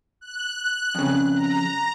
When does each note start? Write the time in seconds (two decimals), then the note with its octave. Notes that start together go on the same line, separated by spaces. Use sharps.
0.21 F#6
0.95 F2 C#3
1.35 A#5